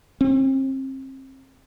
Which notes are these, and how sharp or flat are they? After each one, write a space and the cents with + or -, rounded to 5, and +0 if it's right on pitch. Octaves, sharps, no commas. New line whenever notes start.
C4 +35